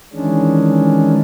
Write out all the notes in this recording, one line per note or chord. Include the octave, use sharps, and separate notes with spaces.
D#3 E3 G#3 C#4 D4